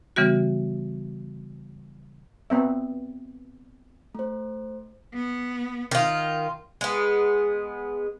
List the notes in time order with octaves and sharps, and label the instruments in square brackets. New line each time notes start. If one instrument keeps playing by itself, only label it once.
[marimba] C#3 E3 G3 B3 F#4
[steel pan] B3 C4 E5
[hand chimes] A3 C5
[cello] B3
[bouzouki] D#3 F4
G#3 B3